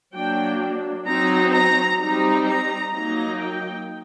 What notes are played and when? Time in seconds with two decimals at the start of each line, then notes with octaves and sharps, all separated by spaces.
0.15 F#3 A#3 D4 G5
1.07 F#3 C4 D#4 A#5
1.54 A#5
1.99 G3 C4 D#4 A#5
2.46 A#5
2.92 F#3 A#3 D#4 A#5
3.38 G5